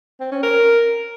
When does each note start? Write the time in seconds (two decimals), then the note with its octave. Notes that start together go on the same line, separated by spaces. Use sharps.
0.20 C4
0.32 C#4
0.43 A#4